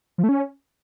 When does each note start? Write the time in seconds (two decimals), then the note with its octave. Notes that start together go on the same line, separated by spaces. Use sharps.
0.18 F3
0.23 A3
0.29 C#4